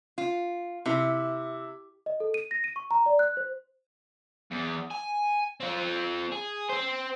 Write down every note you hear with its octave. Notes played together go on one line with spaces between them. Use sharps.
F4
C3 E4
D#5
A4
D#7
A#6
D#7
C#6
A#5
D5
F#6
C5
E2
G#5
C4 F4
G#4
C4 C5